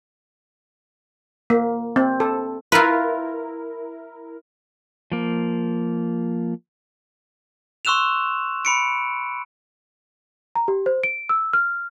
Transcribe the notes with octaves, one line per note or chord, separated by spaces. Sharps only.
A#3
C4
A4
E4 F4 A#4 B4
F3 A#3
C6 C#6 E6 F#6 E7 F7
B5 C#7 D7
A#5
G4
C5
D7
E6
F6